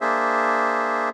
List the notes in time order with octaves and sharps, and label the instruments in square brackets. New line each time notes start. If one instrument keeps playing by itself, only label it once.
[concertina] A#3 D4 G#4 C5 E5